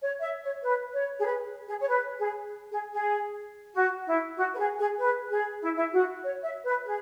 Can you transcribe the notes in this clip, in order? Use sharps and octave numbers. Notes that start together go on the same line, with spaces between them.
C#5
E5
C#5
B4
C#5
G#4
B4
G#4
C#5
B4
G#4
G#4
G#4
F#4
E4
F#4
B4
G#4
G#4
B4
G#4
E4
E4
F#4
C#5
E5
B4
G#4